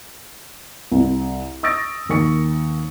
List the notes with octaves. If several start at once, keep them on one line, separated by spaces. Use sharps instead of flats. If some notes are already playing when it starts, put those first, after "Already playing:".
C2
C#6 D#6 E6 A6 A#6 D7
D#2 A#4 C#6 C#7